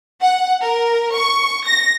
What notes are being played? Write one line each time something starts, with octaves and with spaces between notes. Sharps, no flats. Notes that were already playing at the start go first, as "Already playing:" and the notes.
F#5
A#4
C#6
A#6